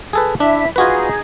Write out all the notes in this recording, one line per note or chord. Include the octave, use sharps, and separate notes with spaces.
G#4 A4 B4
D4 E4 E5
D#4 F4 F#4 G#4 B4